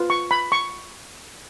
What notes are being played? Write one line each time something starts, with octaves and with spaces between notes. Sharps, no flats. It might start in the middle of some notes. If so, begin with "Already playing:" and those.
Already playing: F4 B4
C#6
B5
C#6